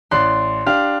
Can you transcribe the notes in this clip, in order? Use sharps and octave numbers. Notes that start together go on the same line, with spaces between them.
A1 D5 C6 F#6
D4 G4 F5